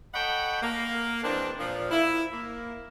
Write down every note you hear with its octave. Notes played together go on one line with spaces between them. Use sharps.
A4 C#5 D#5 F#5 G5 B5
A#3
E3 G#3 C4 D4
A#2 F3
E4
A#3